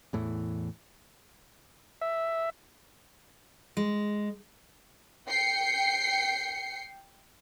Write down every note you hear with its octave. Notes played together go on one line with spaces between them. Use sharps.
E2 A2 E3
E5
G#3
G5 C7 C#7